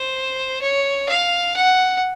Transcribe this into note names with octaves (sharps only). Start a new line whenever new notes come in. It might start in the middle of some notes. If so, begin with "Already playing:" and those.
Already playing: C5
C#5
F5
F#5